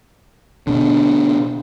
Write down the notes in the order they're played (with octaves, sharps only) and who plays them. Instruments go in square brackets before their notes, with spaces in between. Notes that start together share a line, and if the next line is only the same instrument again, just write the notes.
[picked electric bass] B2 D3